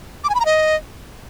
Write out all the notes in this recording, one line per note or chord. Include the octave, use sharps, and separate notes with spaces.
D6
G#5
B5
A#5
D#5